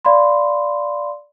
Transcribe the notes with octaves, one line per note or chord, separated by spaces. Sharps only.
D5 F5 B5 C6